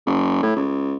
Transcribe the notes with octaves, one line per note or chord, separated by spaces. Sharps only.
F#1
A2
C#2